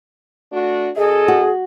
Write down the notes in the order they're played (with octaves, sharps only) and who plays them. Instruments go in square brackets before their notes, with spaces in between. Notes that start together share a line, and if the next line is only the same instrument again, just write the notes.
[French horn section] A3 D4 F#4
[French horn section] F#2 A4 D#5 [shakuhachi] G#4
[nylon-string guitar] F#4